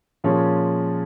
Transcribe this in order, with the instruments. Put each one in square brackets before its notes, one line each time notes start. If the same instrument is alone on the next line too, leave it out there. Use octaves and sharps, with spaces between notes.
[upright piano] A#2 F3 G#3 C#4 C#5